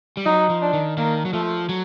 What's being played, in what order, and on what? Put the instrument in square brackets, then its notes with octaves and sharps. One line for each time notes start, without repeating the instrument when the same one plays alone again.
[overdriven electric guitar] G3
[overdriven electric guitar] F#3 [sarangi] D#4
[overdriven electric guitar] F3
[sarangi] D4
[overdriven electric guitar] D#3
[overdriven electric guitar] D#3 [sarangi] A#3
[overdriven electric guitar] F#3
[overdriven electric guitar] F3 [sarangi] A3
[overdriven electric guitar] F#3